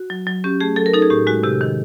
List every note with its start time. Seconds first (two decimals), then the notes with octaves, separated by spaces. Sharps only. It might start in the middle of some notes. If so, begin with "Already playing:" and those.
Already playing: F#4
0.10 F#3
0.27 F#3
0.44 C#4 G4
0.61 A3 G#4
0.76 F#3 A4
0.86 A#4
0.94 D#4 A4
1.02 G#4
1.10 A2 G4
1.27 G#3 F#4
1.43 C3 G4
1.61 D#3